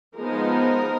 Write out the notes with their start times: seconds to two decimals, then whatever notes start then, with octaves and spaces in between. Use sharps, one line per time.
0.16 F3 G#3 B3 D#4 A#4